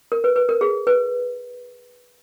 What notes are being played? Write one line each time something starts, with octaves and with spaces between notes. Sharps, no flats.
A#4
B4
B4
A#4
G#4
B4